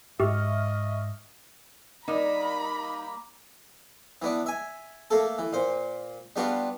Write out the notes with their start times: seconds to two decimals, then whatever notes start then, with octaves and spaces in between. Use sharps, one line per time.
0.20 G#2 G4 D#5 E5 C#6 F6
2.08 G3 A#3 D#4 A#5 B5
4.22 E3 B3 D4
4.46 E5 G#5
5.10 A3 A#3 A4
5.38 E3
5.53 A#2 C5
6.36 G3 B3 D4 F4 F#4